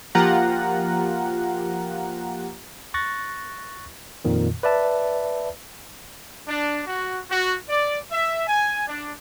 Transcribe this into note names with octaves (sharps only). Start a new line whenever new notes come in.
F3 A#3 F4 G4 F#5 A#5
C#6 F#6 A6 A#6
F2 A#2 D#3
B4 D5 E5 A5
D4
F#4
F#4
D5
E5
G#5
D4